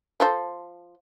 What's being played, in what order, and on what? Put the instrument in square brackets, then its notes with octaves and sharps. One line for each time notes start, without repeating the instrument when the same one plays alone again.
[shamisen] F3 A4 C5